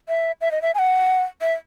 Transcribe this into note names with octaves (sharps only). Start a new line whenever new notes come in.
E5
E5
D#5
E5
G#5
F#5
E5